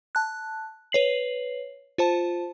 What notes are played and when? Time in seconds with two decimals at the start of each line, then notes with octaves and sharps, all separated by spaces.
0.15 A5 F#6
0.92 B4 C#5 C7 F#7
1.98 F4 C5 A5